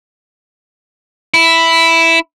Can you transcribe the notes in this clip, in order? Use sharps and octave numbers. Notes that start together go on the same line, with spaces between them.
E4